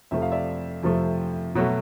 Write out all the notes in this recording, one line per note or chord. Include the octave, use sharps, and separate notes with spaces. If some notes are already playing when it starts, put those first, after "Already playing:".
F2 C3 F3 A3 E5
F5
D5 E5
F2 C3 F3 A3
B2 F#3 A3